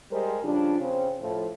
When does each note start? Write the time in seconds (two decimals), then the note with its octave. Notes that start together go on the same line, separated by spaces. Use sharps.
0.11 G3 G#3 G4 A#4 C5
0.43 C#3 F3 G3 D4
0.79 C#3 C4
1.20 A2 F3